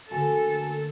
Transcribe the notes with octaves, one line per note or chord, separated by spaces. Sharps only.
D3 A3 A#3 F#4 A4 G#5